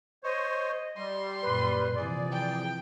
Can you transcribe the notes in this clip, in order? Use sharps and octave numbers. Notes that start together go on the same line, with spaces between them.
C5 C#5 D#5
G3 C6
F#2 A#2 B4
C3 E3 F3 G#4 D5
G5